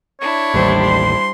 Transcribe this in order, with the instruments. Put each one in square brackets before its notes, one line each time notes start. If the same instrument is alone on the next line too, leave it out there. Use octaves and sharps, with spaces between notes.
[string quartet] D4 E4 [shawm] C#5
[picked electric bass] A1 D#2 [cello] G3 C5
[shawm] C6